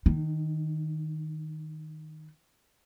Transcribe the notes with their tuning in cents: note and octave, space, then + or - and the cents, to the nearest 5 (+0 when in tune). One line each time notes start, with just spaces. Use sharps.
D#3 +0 D4 +45